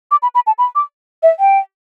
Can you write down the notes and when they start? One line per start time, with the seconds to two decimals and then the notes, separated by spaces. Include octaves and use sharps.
0.11 D6
0.22 B5
0.35 B5
0.47 A5
0.58 B5
0.75 D6
1.23 E5
1.40 G5